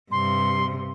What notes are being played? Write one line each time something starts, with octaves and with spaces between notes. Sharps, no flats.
G2 C3 C6